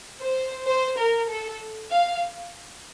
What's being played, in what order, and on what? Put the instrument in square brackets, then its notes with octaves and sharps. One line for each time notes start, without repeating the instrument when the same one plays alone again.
[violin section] C5
C5
A#4
A4
F5